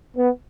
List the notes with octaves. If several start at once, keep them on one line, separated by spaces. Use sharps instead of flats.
B3